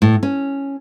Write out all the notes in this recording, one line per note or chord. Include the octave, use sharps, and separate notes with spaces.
A2
C#4